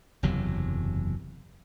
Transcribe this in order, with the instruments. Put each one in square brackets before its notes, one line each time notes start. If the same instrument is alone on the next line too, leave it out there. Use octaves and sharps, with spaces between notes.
[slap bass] F#1 E2 C3 F#3